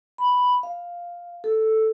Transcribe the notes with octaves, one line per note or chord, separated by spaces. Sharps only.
B5
F5
A4